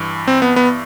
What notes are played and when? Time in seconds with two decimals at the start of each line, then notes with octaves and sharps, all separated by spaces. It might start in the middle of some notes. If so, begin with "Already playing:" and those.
Already playing: G2 E3
0.28 C4
0.42 B3
0.56 B3